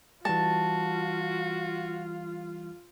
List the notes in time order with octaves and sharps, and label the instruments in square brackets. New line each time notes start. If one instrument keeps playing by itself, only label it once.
[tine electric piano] E3 G3 [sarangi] F4 [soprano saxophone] F#4 [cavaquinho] A5